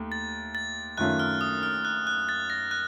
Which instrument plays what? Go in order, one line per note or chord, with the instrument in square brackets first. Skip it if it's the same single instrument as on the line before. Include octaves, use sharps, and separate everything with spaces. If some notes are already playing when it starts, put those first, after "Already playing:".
Already playing: [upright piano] D#2 A3
[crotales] A6
A6
[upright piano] F#2 D#3 A3 C#4 F4 [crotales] F#6
[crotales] F6
D#6
F6
F#6
F#6
A6
A#6
F#6